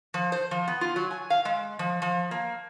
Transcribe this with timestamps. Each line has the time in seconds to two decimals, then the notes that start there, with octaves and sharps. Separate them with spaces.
0.14 F3
0.32 C5
0.51 F3
0.68 B3
0.81 F4
0.96 F#3
1.11 G#5
1.30 F5
1.45 G#3
1.79 F3
2.02 F3
2.31 A#3